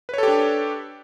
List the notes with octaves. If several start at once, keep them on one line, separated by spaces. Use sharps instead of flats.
D4 G4 A4 B4 C#5